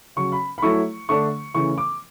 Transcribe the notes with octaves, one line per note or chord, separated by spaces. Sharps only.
C#3 F#3 C#4 C#6
B5
B5
F#3 A3 E4 C#6
D3 A3 D4 C#6
C#3 E3 A3 C#6
D6